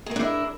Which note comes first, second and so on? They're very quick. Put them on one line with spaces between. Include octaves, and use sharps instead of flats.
G#4 A#4 D4 E4